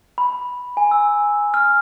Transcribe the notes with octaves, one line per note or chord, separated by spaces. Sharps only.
B5
G#5
E6
F6